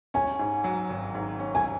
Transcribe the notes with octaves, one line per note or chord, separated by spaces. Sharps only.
C#4 G#5
G#2
F#3
G#1
G#2
C#4
G#5